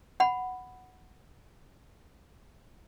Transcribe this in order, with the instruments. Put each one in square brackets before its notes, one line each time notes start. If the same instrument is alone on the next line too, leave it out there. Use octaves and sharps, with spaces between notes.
[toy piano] F#5 B5